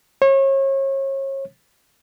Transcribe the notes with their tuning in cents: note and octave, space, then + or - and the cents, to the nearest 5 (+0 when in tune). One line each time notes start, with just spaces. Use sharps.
C#5 -35